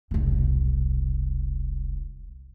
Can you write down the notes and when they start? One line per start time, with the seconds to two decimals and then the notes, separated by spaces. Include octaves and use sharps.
0.11 E1 C2